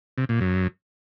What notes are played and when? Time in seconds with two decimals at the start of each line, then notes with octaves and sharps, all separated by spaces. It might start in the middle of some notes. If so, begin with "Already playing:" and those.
0.18 C3
0.29 A#2
0.41 F#2